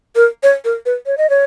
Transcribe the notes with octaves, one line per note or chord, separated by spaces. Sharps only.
A#4
C#5
A#4
B4
C#5
D#5
C#5